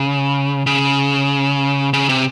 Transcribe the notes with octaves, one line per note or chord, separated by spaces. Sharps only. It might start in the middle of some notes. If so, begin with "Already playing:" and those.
Already playing: C#3
C#3
C#3
C3